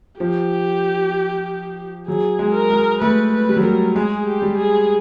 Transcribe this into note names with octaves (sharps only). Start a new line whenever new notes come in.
F3 G4
F#3 G#4
G#3
A#4
G#3
A3 B4
B4
G3
F#3
G3 A#4
G#3 G#4
G4
G3
G#4